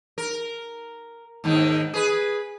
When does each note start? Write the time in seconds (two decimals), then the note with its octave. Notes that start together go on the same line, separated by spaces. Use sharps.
0.18 A#4
1.44 D#2 G#2 D#3
1.94 G#4 B4